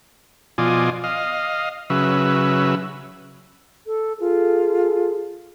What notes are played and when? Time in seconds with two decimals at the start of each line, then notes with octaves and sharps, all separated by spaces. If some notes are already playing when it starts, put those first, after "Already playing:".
0.58 B2 F3 F4 D5 D#5 G#5
1.04 D#5 F5
1.90 C#3 F#3 B4 E5
3.86 A4
4.20 F4 G#4 A4